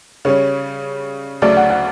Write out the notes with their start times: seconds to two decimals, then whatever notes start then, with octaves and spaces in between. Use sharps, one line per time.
0.25 C#3 G3 C#4 C#5
1.42 D2 C#3 F#3 A3 D5
1.57 F#5
1.70 F#5